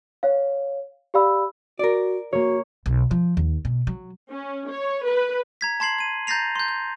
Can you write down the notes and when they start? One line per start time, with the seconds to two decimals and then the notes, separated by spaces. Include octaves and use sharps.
0.23 C#5 F5
1.14 G4 D5 F5 B5 E6
1.79 F#4 A#4 D5
2.33 A#3 F#4 C#5
2.86 B1
3.11 F3
3.37 D#2
3.65 B2
3.87 F#3
4.31 C#4
4.71 C#5
5.06 B4
5.61 A#5 G#6 B6
5.80 A5 C6 G#6 C7 F#7
5.99 G#6 D#7
6.27 A#5 G6 A6 A#6 C7 F7
6.56 C6 G6
6.68 G6